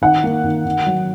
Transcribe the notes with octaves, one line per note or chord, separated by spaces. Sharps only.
D#3 F#5
A#3
D#3
D#3
F#3